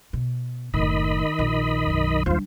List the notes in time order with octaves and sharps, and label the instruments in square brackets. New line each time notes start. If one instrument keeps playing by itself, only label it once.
[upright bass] B2
[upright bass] F#1 A2 [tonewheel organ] D#3 D#5 B5
[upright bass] A#1
B1 F#2
[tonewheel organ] D#2 F4 C5 [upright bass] G3 D4